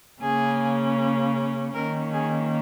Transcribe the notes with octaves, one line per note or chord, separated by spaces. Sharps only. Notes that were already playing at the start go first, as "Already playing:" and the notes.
C#3 A#3 C#4 G#4
D#3 A#3 C#4 A#4
G#4